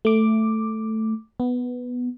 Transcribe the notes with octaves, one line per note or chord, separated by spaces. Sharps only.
A3 D6
B3